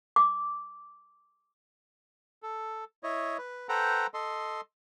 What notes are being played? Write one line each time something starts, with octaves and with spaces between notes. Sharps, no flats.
D6
A4
E4 C#5 D#5
B4
A4 B4 C5 F#5 G5 A#5
A4 D#5 C6